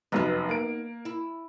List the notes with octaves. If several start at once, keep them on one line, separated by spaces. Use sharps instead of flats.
F1 F#2 B3 D#4
A#3 D7
E4